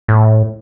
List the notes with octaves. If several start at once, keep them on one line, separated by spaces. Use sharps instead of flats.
A2